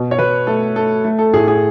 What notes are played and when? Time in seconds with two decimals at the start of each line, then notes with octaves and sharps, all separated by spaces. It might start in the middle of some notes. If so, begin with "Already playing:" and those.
Already playing: B2
0.11 C#5
0.19 B2 B4
0.47 A3 A4
0.76 A3 A4
1.04 A3
1.19 A4
1.33 A2 G#4
1.48 G#4